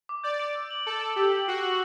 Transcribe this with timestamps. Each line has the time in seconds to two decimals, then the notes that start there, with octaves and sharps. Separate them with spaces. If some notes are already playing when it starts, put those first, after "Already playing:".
0.09 D6
0.24 D5 G6
0.40 D7
0.55 E6
0.71 F#7
0.86 A4 G6
1.01 D7
1.16 G4 E6
1.32 F#7
1.48 F#4 C7
1.63 F#7